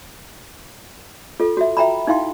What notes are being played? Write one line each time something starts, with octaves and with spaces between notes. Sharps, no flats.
F4 A4
F#4 E5
E5 G5 A#5 B5
D#4 E4 F5 G5 C6